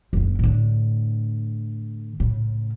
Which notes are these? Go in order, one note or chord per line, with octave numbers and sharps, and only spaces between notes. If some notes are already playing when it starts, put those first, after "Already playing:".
F#1 D3
A2 D3
A2 C#3